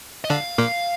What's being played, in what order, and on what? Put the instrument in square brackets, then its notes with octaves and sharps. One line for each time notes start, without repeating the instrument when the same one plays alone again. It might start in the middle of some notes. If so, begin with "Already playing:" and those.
[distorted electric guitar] D#5
[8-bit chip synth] D3 D4 [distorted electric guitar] F5
[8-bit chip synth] A#2 A#3